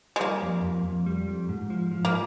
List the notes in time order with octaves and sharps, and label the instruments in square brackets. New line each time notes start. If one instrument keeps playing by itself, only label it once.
[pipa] G#3
[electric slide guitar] G3 [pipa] A#3
[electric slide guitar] F2
F2
F2
G3
F2
G#2
F3
F3
[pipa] A#3